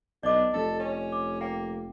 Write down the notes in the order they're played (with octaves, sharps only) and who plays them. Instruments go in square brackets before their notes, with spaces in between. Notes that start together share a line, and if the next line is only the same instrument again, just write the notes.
[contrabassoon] B1 [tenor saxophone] D4 [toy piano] D5 D#5 D6
[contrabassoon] F1 [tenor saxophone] A4
[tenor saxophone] C#4
[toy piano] D6
[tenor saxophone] A#3 [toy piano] G5